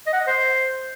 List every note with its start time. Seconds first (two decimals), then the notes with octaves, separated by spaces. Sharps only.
0.07 D#5
0.13 F#5
0.20 D#5
0.27 C5